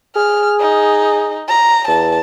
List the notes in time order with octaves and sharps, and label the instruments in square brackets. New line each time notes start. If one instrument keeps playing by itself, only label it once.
[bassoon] G#4 [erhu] F6
[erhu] D#4
A#5
[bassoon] E2 [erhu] A5